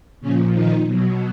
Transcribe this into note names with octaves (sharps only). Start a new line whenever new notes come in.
A#2 C#3 F3 C#4
D#3 D#4
B2 F#3